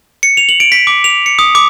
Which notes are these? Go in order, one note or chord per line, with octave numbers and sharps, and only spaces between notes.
C#7
F7
F#7
D7
B6
D6
F7
C#7
D#6
D6